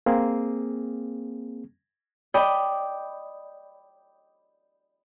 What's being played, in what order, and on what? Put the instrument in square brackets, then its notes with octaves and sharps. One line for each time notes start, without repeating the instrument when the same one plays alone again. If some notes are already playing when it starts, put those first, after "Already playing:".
[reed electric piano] A#3 C4 G#4
[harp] D5 D#5 G5 B5